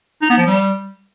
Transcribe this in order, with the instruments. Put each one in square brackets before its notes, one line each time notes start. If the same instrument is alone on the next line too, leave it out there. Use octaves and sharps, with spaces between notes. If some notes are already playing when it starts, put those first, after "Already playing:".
[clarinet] D#4
B3
F3
G3